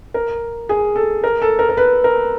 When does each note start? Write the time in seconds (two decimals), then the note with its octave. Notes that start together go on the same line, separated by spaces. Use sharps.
0.14 A#4
0.69 G#4
0.96 A4
1.24 A#4
1.42 A4
1.59 A#4
1.69 A#4
1.77 B4
2.04 A#4